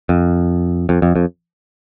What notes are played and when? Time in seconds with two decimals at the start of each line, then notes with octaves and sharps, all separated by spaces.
0.09 F2
0.89 F2
1.02 F2
1.16 F2